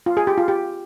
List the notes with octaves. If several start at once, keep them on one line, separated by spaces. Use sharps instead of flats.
F4
G#4
G4
F4
G4